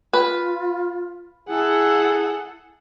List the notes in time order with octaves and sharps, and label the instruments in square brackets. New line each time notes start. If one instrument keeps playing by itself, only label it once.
[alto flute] F4 [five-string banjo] B4
[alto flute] E4 [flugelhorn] G#4 [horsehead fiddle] A4 F#5